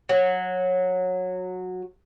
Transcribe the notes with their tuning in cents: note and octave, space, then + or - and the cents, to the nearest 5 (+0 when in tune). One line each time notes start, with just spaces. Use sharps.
F#3 -15